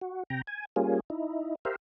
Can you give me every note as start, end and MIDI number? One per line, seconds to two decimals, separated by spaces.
0.01 0.23 66
0.30 0.42 48
0.30 0.42 79
0.30 0.42 82
0.47 0.65 80
0.76 1.00 55
0.76 1.00 58
0.76 1.00 61
0.76 1.00 65
0.76 1.00 68
1.10 1.55 63
1.10 1.55 64
1.65 1.76 67
1.65 1.76 70
1.65 1.76 72
1.65 1.76 76
1.65 1.76 77